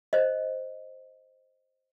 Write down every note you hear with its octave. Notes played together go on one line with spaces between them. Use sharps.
C5 D#5